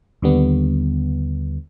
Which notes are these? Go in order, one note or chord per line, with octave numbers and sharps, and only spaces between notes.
D#2 D3 G3 B3